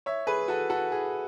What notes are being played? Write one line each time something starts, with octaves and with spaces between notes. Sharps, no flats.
C#5 E5
G#4 B4
F#4 A4
F#4 A4
G#4